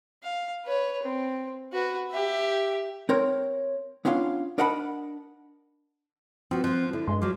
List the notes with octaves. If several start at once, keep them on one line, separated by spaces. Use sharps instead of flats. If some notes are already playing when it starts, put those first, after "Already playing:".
F5
B4 C#5
C4
F#4 B4
G4 E5
C4 A#4 C#5
B3 C#4 D4 F4 F5
D4 A#4 D#5 F#5 A5 B5
F3 C4 F#4 B4
F3 F4 F#6
D3 E4
G2 G#3 C6
F3 F#3 D6